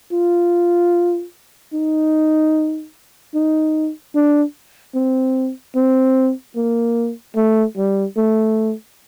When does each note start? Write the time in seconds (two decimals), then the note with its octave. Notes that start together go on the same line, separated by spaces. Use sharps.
0.12 F4
1.74 D#4
3.34 D#4
4.15 D4
4.95 C4
5.75 C4
6.56 A#3
7.36 A3
7.77 G3
8.17 A3